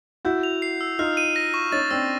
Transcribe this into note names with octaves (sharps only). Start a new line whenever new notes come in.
E4 F#4 G6
F7
C7
E6
D#4 F4 F6
D#7
A#6
C#6
C#4 D#4 A6
C4 D4 E6